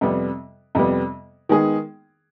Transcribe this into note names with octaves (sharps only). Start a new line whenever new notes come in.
F2 C3 G3 B3
F2 C3 G3 B3
D#3 G#3 B3 D#4 G#4